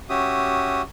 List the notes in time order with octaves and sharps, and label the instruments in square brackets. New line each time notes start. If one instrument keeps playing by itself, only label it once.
[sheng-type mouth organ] C#4 F#4 G4 E5 D#6